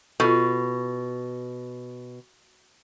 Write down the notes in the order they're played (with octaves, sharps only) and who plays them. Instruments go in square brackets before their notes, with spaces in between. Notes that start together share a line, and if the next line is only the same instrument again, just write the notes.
[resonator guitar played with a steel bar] B2 [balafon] F4 A4